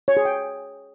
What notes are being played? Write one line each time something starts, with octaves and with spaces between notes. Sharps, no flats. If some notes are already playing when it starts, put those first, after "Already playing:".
C#5
G#4
G5